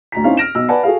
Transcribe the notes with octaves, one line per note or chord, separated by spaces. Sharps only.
D2 A#5 B6
C4 C#4 D#4 E4 F5
F6 A#6 D7 E7
B1 E6
B4 D5 F#5 G#5 A5 B5
F#4 G#4 A4 F5